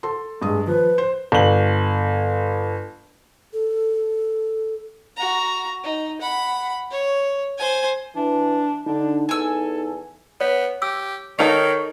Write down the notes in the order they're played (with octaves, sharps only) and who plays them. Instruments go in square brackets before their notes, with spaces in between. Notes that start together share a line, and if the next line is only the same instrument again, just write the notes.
[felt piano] A4 C6
[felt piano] G2 D#6 [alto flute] G#3
[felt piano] F3 [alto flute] B4
[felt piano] C5
[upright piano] G1 F#7
[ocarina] A4
[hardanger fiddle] F#4 A#5
D#4
F#5 B5
C#5
C5 G#5
[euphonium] E3 [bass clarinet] D4
[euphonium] D3 [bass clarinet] D4 [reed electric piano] D#4
[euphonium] E2 [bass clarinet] A4 [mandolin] G#5 E6
[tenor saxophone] B3 [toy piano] C#5
[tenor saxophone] G4 [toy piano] E6
[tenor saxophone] D#3 [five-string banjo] D#4 A4 A#4 [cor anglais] C#5